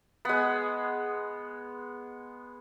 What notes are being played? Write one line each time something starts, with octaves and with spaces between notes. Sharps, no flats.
G#3 B3